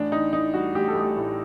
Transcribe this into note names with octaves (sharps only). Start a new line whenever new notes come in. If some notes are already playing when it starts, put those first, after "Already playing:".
Already playing: A1 D4
A1 D#4
A2 D#4
G3 F#4
A1 G4
A4
A1
G4
A2